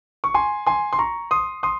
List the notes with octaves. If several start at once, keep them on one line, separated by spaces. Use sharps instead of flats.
C#6
G#5 C6
G#5 C6
C6
A#5 C#6
C6 D#6
C6 D#6